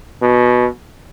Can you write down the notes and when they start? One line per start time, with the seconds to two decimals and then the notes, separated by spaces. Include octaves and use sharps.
0.22 B2